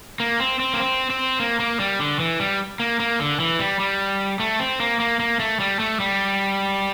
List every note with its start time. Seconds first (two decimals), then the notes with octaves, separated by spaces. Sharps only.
0.20 A#3
0.40 C4
0.60 C4
0.73 A#3
0.80 C4
1.10 C4
1.40 A#3
1.60 A#3
1.80 G3
1.99 D3
2.20 E3
2.40 G3
2.80 A#3
3.00 A#3
3.20 D3
3.40 E3
3.59 G3
3.80 G3
4.40 A3
4.60 C4
4.80 A#3
5.00 A#3
5.20 A#3
5.40 A3
5.60 G3
5.80 A3
6.00 G3